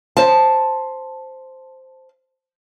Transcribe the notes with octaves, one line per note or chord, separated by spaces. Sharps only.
C5 A5